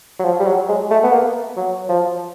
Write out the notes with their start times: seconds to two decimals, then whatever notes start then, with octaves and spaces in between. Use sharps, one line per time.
0.19 F#3
0.24 F3
0.40 G3
0.46 F#3
0.69 G#3
0.90 A3
1.04 B3
1.13 A#3
1.57 F#3
1.89 F3